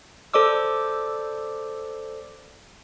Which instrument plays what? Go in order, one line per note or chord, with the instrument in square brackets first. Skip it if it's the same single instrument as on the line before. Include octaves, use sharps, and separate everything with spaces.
[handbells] A4 C5 D5 D6 E6